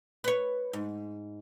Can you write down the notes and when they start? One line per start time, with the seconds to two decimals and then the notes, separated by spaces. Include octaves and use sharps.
0.24 B4 C#5
0.73 G#2